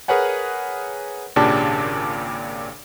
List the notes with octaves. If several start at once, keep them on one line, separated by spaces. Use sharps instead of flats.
G#4 A#4 B4 C#5 F#5 G#5
G#1 A#2 C#3 D4 G4 A5